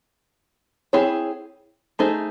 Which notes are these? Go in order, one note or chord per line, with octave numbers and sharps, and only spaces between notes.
C4 E4 G#4 C#5
A3 D#4 G#4 C5